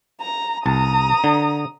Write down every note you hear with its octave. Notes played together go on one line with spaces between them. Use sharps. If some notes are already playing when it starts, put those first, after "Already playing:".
A#5
C2 A5 A#5 D#6
D3